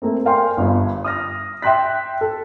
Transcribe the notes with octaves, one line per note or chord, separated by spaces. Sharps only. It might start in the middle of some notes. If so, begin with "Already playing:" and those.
A3 A#3 C4
A#4 D5 F5 G5 G#5 C6
G1 G2
D#6 F6 A#6
E5 G5 C6 F#6 B6
A4